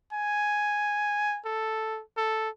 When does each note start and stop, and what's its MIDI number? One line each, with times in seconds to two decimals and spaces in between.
0.13 1.39 80
1.45 2.01 69
2.17 2.50 69